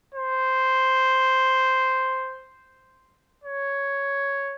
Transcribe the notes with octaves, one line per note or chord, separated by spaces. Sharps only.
C5
C#5